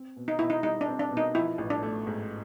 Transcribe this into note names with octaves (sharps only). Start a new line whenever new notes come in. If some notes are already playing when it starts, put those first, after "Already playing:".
Already playing: C4
B2
D#4
B2 E4
D#4
G3 D#4
D4
C4
D4
B2
D#4
F3 E4
A1
D4
A3
G#2